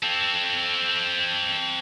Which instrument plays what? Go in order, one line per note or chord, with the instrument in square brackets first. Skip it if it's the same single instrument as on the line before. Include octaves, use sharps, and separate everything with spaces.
[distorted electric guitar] C4 A4